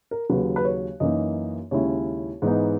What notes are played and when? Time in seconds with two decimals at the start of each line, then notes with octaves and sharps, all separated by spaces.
0.11 A#4
0.29 D#2 C#3 F#3 B4
0.56 B4
0.65 C#5
1.00 F#2 E3 A#3 D#4 D#5
1.71 D#2 C#3 G#3 C#4 E4 C#5
2.42 G#2 E3 B3 D#4